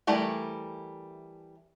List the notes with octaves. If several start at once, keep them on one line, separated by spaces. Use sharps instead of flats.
E3 G3 A3 A#4